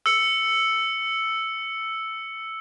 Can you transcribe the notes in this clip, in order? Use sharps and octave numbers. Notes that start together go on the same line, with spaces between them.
E6 C#7